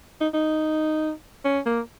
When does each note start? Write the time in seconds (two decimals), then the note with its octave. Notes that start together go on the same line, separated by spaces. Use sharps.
0.21 D#4
0.34 D#4
1.45 C#4
1.66 A#3